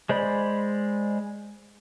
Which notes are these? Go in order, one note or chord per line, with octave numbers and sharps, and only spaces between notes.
G#3 C5 D5 B5